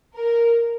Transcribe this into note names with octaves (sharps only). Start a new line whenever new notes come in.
A#4